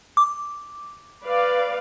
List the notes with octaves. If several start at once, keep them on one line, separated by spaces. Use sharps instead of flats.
D6
B4 D5 F5